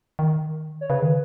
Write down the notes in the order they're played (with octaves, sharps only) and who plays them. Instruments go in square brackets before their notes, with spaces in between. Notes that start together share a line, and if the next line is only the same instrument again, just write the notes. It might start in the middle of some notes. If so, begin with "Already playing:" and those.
[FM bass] D#3
[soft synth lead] C#5
[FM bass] C#3 [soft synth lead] B4
[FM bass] D#3